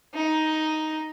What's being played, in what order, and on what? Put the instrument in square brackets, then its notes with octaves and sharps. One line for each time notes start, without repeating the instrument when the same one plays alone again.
[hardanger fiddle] D#4